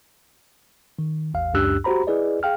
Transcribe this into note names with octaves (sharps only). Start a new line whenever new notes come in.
D#3
A1 E2 F5
C#2 F#2 D4 G4 E6 F#6
F#4 G4 C5 A#5 B5
E4 G#4 B4 D5 D#5
G#4 F5 G5 F6